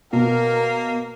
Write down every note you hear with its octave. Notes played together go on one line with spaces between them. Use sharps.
B2 A#3 A#4